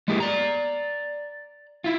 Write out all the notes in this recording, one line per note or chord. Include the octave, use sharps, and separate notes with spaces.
G#3 A#3 E4 G4 G#4
D5 A#5
E4 F4